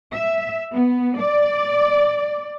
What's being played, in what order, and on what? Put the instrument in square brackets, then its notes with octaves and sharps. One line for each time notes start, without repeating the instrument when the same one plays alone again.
[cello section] E5
B3
D5